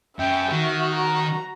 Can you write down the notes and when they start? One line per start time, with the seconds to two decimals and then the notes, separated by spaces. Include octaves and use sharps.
0.19 F#2 E5 G5
0.52 D#3 F#4
0.95 A#5